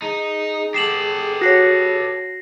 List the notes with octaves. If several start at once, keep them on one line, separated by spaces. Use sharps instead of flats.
D#4 G#4
G4 A4 C7 E7 F#7
F#4 C#5 A#6 C7